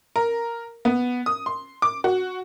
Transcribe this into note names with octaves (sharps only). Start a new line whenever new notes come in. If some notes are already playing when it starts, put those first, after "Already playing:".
A#4
B3
D#6
C6
D6
F#4